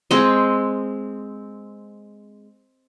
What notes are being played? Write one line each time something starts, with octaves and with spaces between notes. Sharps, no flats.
G#3 C4 D#5